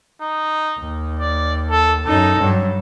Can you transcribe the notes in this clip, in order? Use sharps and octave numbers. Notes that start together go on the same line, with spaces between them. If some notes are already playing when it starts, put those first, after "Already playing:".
D#4
D#2
D5
A4
F#2 D#4 A4
G2 F#3